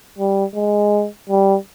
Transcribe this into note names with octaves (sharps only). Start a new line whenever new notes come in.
G3
G#3
G3